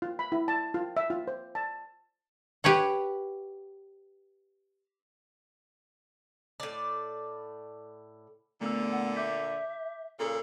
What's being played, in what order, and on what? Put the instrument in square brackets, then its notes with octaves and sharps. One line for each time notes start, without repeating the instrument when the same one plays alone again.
[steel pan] F4
B5
E4
A5
F4
E5
F4
C5
A5
[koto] G4 B4 C#5 F#5
[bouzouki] A2 D5
[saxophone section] A#2 D3 [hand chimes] A3 B3 E6
[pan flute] F#5
[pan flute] E5 [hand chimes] D6 G6 B6
[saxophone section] A#2 C#3 [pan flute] A4